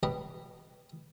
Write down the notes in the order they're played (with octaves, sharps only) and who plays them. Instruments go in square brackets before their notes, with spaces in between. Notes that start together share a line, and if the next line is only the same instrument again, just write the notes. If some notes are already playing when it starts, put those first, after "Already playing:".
[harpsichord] B2 G4 D#5 B5